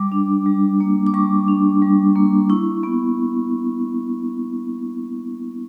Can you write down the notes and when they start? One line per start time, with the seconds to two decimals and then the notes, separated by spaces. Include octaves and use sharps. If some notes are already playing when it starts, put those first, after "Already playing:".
Already playing: G3 D6
0.12 D4
0.46 G3
0.80 A#3
1.07 D6
1.14 G3 C#6
1.48 D4
1.82 G3
2.16 A#3
2.50 E4 C#6
2.83 B3